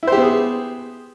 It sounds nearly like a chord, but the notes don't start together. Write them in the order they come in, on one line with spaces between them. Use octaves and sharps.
E4 C5 G4 B3 G#4